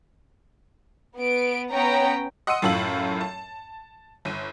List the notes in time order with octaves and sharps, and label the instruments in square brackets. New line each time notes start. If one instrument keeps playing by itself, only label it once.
[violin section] B3 D7
B3 C#4 C#5 G5 A#5
[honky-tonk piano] D#5 F#5 C6 E6 C#7 D#7
F#2 A2 F4 A4 E6 F#7
A5
G1 D#7